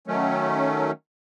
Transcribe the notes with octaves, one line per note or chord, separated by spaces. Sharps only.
D#3 F#3 A3 C#4